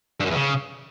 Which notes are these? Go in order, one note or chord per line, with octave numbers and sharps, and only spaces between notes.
G2
F#2
E2
C#3